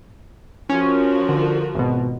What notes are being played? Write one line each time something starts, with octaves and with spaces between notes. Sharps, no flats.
F3 C#4 F#4 A#4
D3
G#1 B2